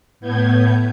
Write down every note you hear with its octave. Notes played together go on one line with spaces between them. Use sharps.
A2 B3 G6 G#6